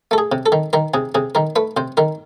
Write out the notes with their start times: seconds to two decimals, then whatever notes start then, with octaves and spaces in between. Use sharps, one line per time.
0.11 A3 A4
0.18 G#4
0.32 C3
0.46 A4
0.52 D#3
0.73 D#3 A#4
0.94 C3 G#4
1.15 C3 G#4
1.35 D#3 A#4
1.56 A3 B4
1.77 C3 C5
1.97 D#3 A#4